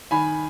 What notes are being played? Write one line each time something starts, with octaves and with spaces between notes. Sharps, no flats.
D#3 G#5 B5